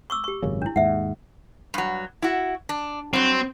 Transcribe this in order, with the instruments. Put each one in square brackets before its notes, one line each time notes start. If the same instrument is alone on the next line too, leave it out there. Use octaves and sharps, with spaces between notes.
[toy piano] C#6 D6 E6
G4 C#6
[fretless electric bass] G#1 F#2 C#3
[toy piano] D4 E4
[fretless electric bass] D#2 G#2 [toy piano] E5 F#5
[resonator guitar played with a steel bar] G2 F#3
E4 F#4
D4
[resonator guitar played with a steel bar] G2 F#3 [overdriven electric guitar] C4